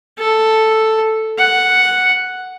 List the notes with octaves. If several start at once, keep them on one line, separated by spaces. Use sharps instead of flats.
A4
F#5